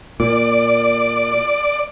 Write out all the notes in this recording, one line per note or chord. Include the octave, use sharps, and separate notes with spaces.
A#2 D5